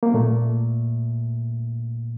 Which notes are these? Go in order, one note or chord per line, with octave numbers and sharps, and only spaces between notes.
A#3
A#2 A3